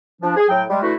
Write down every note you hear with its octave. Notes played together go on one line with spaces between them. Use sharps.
F3 D4
G#4
A2 F#3 G5
G3 G#3
D3 E3 A3 E4 F#4